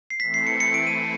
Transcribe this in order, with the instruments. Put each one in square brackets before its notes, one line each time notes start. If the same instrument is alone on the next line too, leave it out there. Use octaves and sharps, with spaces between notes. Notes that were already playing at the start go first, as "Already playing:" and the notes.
[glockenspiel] C7
[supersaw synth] E3 A3 C4 E4 A4 [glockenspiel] B6
[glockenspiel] C7
C#7
C#7
D7
D#7
D7